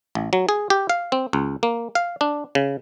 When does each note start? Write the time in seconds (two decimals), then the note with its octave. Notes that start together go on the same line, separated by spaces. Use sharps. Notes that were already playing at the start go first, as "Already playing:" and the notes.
0.15 A1
0.33 F#3
0.49 G#4
0.70 G4
0.89 F5
1.12 C4
1.33 C#2
1.63 A#3
1.95 F5
2.21 D4
2.55 C#3